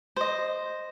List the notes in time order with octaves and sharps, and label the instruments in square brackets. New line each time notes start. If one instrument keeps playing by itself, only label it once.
[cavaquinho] C5 D#5